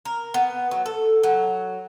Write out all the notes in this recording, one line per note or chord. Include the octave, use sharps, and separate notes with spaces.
A#4
B3
F#3
A4
F#3